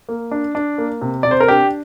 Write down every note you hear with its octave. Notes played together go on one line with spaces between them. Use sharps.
A#3
D4
D4
A#3
C3
C3 D5
C5
A#4
D4 G4